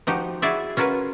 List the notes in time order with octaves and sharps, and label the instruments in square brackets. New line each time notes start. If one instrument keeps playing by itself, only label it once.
[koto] F3 D#4 F#4 G4
E4 F#4 G#4 D5 E5
C#4 F4 F#4 A#4 B4